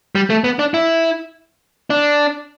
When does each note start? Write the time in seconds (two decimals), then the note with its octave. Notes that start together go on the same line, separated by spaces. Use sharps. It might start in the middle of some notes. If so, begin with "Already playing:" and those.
0.15 G3
0.30 A3
0.44 B3
0.59 D4
0.74 E4
1.90 D4